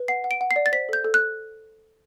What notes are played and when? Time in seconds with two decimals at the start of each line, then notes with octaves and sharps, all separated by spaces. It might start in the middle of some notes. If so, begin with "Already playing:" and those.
Already playing: B4
0.08 F#5 C7
0.24 F#5
0.31 D7
0.41 F#5
0.51 C7
0.56 D5
0.66 A6
0.72 C5 B6
0.89 A4 G6
1.05 A4
1.14 F#6